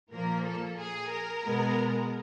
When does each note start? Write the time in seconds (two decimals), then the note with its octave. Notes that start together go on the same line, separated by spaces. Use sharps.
0.12 A#2 F3 A#3 A#4
0.45 A4
0.78 G#4
1.11 A#4
1.45 B2 G#3 B3